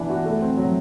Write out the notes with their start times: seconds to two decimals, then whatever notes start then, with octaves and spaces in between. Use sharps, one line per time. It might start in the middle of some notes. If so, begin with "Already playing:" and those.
Already playing: E3 B3 D4
0.10 F#4
0.26 A3
0.42 C4
0.57 F#3